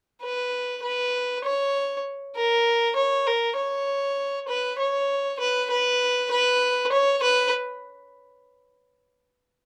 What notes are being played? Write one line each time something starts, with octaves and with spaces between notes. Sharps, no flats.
B4
B4
C#5
A#4
C#5
A#4
C#5
B4
C#5
B4
B4
B4
C#5
B4